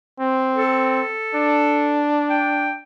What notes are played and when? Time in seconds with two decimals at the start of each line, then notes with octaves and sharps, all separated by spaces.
0.20 C4
0.54 A4
1.35 D4
2.30 G5